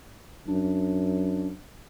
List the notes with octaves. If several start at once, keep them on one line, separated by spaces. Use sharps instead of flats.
F#2 D4